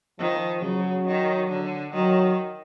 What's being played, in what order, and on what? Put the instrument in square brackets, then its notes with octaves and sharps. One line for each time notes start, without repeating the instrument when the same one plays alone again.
[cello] D#3 [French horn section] F3
[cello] C#3 [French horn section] F#3
[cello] D#3
D3
[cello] D#3 [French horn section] F#3